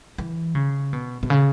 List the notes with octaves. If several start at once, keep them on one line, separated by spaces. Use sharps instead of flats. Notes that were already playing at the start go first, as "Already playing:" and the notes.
E3
C#3
B2
B2
C#3